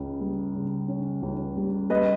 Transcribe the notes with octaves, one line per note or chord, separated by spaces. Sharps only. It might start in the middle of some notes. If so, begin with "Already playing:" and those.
Already playing: C#2 C#3 C#4
G3
C#3
C#4
C#2
G3
G3 B4 D#5